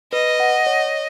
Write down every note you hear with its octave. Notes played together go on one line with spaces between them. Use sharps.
B4 D#5
F#5
C#5